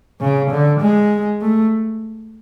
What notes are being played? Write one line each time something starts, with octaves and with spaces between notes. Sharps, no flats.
C#3
D3
G#3
A3